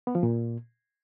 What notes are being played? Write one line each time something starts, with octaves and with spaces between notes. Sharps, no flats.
B3
F3
A#2